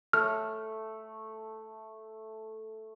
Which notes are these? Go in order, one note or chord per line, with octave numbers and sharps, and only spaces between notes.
A3 F6